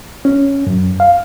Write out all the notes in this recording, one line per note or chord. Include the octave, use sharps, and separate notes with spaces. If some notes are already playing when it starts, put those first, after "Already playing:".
C#4
F#2
F5